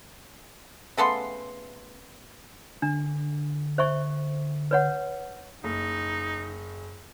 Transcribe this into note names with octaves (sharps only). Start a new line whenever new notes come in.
C#3 A3 B3 C6
D3 D4
C5 E5 C#6
B4 C#5 F#5
F#1 D#4